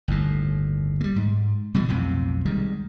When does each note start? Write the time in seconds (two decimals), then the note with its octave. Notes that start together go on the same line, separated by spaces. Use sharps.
0.08 G1 D#2 A2
1.01 G3 A3
1.16 G#2
1.74 B2 E3 F#3 G3
1.88 B1 F2 A2 C3
2.45 C2 D#3 G3 G#3